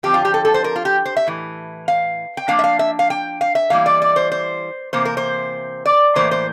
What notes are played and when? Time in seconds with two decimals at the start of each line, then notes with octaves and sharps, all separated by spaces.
0.03 D3 F3 C4 G4
0.14 F4
0.25 G4
0.34 A4
0.45 A4
0.54 C5
0.64 A#4
0.76 F4
0.85 G4
1.06 C5
1.17 E5
1.27 A2 E3
1.88 F5
2.37 G5
2.48 F3 A#3 D4 F5
2.59 E5
2.64 F5
2.79 E5
2.99 F5
3.10 G5
3.41 F5
3.55 E5
3.70 E3 G3 A#3 E4 F5
3.86 D5
4.02 D5
4.16 C5
4.32 C5
4.93 C3 E3 A#3 C5
5.05 A#4
5.17 C5
5.86 D5
6.16 A2 E3 A#3 C5
6.31 C5